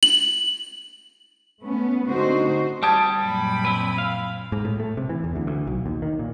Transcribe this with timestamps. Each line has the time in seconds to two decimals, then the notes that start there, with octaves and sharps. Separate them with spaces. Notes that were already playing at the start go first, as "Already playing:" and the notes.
0.03 F#7
1.62 A3 B3 C#4
2.07 D3 A3 C4 D#4 F#4 C5
2.83 G3 G4 A5 D#6 G#6
3.22 F#2 A#2 B5
3.65 C4 E4 B4
3.98 F5
4.52 G#2
4.65 A2
4.80 A3
4.97 C3
5.09 E3
5.24 E2
5.36 D2
5.47 D2
5.67 B1
5.86 D#2
6.02 D#3
6.19 A#2